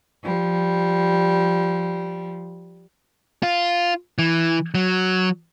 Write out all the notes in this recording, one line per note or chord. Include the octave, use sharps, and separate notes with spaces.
F3 G3
F4
E3
F#3